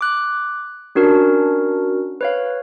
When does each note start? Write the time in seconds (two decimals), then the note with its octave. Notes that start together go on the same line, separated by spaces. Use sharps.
0.01 D6 F#6
0.95 C#4 D4 F#4 A#4
2.21 B4 C#5 F5